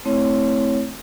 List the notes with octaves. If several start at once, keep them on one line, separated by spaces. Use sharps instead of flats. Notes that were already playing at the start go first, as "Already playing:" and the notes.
A3 C4 E4 C#5